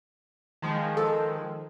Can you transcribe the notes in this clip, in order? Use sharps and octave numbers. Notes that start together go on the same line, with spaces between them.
D#3 F3 G#3
A4